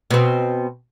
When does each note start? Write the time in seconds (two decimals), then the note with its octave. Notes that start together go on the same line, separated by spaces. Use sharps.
0.11 B2 C4